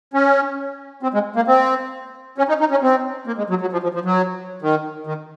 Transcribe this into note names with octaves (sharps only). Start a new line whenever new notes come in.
C#4
C4
G#3
A#3
C4
C#4
D#4
D#4
C#4
C4
A#3
G#3
F#3
F#3
F3
F3
F3
F#3
D#3
D#3